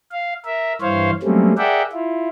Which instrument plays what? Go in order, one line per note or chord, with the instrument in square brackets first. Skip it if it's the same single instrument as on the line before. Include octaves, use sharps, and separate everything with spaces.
[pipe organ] F5
A#4 E5
G2 E3 C5 C#5 F5
F#3 G3 A3 A#3 C4 C#4
G#4 A#4 D5 E5 F#5 G5
E4 F4